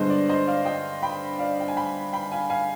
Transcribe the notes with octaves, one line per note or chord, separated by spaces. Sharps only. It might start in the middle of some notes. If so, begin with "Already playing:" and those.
Already playing: G2 D3 G#3 B3 C5 D#5
D5
C5 D#5
D5 F5
D#5 G5
G5 B5
D5 F5
G5
G#5
G5 B5
G5 B5
F5 G#5
F5 G#5